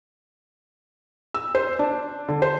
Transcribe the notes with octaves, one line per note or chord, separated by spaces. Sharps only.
E6
C5
D4
D3
C5